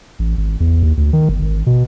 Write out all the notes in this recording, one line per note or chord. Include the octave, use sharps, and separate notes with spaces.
A1
G#1
E2
D#2
D2
D#3
G1
G#1
B2